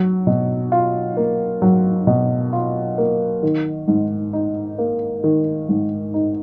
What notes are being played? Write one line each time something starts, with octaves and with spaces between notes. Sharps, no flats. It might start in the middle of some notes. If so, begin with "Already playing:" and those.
Already playing: F#3
B2
F4
A#3
F#3
B2
F4
A#3
D#3
G#2
D#4
A#3
D#3
G#2
D#4